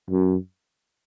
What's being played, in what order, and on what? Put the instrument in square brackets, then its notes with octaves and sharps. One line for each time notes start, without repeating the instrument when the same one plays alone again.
[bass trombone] F#2